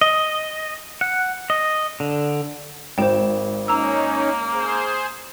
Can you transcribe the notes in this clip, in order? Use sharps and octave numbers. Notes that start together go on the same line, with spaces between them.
D#5
F#5
D#5
D3
G#1 C5 G5 E7
A#3 C#4 D#4 A#5 E6
G#4 C5